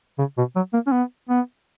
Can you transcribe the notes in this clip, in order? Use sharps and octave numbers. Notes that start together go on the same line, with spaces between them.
C#3
B2
F#3
A#3
C#4
B3
B3